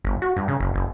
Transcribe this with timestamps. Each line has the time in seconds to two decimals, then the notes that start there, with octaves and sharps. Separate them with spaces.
0.05 G1
0.22 F#4
0.37 G2
0.48 C#3
0.60 F#1
0.74 F#1